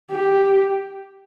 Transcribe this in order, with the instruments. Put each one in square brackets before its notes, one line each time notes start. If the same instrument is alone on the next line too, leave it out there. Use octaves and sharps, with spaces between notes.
[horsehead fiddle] G4